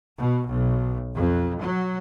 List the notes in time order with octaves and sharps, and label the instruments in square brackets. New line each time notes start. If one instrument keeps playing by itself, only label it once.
[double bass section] B2
B1
F2
F#3